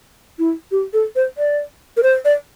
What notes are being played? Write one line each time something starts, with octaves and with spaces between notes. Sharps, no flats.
E4
G4
A4
C5
D5
A#4
C5
D5